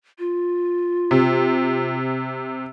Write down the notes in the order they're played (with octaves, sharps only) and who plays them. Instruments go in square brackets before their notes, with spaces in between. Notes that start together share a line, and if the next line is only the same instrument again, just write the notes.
[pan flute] F4
[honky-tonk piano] C3